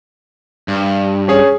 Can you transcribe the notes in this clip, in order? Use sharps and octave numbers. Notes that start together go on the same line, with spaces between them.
G2
C#4 G#4 C#5